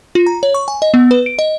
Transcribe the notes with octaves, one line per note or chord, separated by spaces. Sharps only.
F4
A#5
C#5
C#6
G#5
D#5
B3
B4
D7
D#5